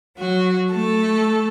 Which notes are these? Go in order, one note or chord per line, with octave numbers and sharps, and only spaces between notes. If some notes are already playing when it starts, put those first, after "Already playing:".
F#3 F#4
A3 A4